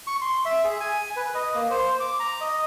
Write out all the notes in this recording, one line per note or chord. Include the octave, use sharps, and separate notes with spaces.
C#6
C6
E5
G#4
G#5
B4
D#5
A#3
C5
D6
A#5
D#5